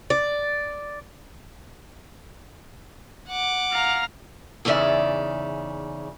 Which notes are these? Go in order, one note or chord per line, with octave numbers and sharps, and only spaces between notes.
D5
F#5 D6
F5 A#5
E2 C#3 D#4 D5 E5